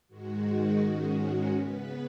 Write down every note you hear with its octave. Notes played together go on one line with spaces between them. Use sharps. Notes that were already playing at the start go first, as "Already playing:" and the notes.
G#2 D#3 G#3 F#4
D#4
G#2 D#3 G#3 C#4 F#4
C#3 B3 B4